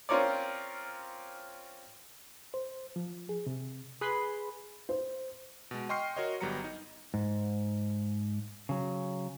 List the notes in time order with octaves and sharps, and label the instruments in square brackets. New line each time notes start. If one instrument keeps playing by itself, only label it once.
[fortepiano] C4 C#4 F4 A#4 C#5 D5
[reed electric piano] C5
F3
G#4
C3
[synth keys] G#4 B4 B5 C6
[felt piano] C5
[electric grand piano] B2 G#3
D#5 G5 C6 C#6 F6 C7
F#4 A#4 C#5 D#5
G1 F#3 G3 B3 A#5 C#7
D#4
[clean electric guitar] G#2
C#3 F#3